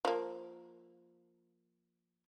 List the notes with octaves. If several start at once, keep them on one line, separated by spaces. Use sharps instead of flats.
F3 A#3